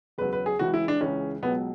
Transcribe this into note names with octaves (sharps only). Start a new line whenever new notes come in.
E2 C#3 F#3 B4
B4
G#4
C#2 C#3 E3 F#4
E4
D4
C#2 C#3 E3 C#4
C#2 B2 F#3 B3